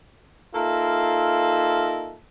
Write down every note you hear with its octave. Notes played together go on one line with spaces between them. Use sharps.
A#3 D#4 F4 A4 A#4 E5